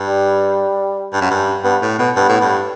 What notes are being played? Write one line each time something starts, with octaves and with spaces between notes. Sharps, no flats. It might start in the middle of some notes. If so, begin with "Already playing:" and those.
Already playing: G2
G3
G2
F#2
G2
G2 B3
A2
B2 B3
G2 B3
A2
G2